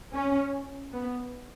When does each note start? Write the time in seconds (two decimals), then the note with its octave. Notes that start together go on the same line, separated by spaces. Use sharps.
0.13 C#4
0.93 B3